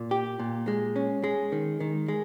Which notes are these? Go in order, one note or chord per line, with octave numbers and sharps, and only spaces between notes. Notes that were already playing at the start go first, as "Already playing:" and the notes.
Already playing: A#2
G4
A#2
G#3
C#4
G#3
D#3
D#3
G#3